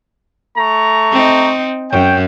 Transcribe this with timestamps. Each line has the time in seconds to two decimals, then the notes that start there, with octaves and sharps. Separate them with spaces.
0.58 A3 A#5 C#6
1.12 C4 D#4
1.92 F#2 C#5 G5